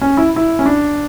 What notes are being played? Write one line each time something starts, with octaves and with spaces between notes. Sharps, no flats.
C#4
E4
E4
C#4
D4